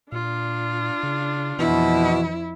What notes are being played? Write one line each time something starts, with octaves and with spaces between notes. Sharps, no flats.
A#2 D4 F4
C#3
F2 B2 E3 E4